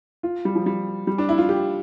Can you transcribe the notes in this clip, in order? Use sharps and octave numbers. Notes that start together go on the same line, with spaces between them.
F4
G3
F3
G3
G3
D4
E4
F4
G4